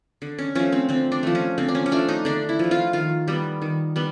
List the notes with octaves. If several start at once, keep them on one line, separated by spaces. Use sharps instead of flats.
D3
C#4
F3 A3 C#4
C4
D3 C4
D4
F3 A3
C#4
D3 C4
D4
C#4
C#4
F3 A3 D4
D#4
D3 D4
E4
F3 A3
F4
D#3 F4
G3 B3
D#3
G3 B3